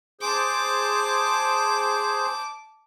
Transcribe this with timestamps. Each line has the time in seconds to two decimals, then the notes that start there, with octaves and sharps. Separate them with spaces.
0.21 G#4 C5 A5 D6